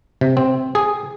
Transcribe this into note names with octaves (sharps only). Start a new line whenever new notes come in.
C3
C4
G#4